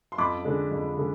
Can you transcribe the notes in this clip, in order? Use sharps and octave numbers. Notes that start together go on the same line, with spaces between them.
C6
F2 B5 D6
D3 G#3 D4
F2
D3 G#3